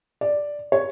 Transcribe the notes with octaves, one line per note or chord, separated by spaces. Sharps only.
D5
C#5